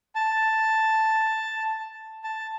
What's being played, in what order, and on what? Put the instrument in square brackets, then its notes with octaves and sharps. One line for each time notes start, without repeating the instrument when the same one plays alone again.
[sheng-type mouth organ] A5
A5